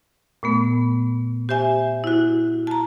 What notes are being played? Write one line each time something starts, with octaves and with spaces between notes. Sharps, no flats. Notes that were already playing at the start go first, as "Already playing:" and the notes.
A#2 A3 B3
G4 C5 E5 G#5
E4 F#4
A5 A#5